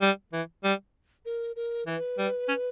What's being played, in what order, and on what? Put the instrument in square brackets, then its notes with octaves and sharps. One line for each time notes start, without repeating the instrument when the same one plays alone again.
[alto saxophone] G3
E3
G3
[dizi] A#4
A#4
[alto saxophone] E3 [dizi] B4
[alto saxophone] G3
C#4